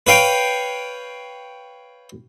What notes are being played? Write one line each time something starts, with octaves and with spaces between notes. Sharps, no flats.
B4 C#5 F5 G5